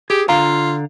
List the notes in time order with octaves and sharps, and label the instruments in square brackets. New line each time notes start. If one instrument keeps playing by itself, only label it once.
[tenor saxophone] G4 [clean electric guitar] G#4
[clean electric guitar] D3 F5 A#5 [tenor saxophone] F4